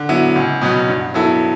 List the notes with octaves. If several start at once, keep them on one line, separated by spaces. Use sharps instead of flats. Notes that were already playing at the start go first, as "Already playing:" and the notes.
Already playing: D3
F#3 B3 E4
C#2
B2 F#3 B3
G2
F#3 B3 E4 A4